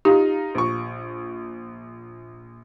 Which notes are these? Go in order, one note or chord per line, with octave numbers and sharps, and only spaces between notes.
D#4 F4 G4
A#1 C#6